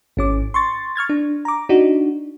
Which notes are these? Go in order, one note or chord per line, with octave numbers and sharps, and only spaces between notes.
G#1 C#4 D6
C6 C#6 A6
C#6 F6 G#6 A6
D4
A#5 D6
D4 D#4 F#4